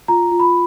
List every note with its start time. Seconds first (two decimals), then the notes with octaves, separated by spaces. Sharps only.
0.08 F4 A#5
0.31 F4
0.40 B5